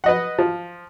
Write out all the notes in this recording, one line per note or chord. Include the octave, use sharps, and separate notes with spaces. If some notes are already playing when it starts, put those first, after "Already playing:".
B4 D#5 F#5
F3